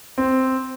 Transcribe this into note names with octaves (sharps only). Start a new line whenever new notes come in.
C4